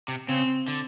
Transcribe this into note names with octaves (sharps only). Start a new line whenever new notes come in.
C3
C#3 C4
D3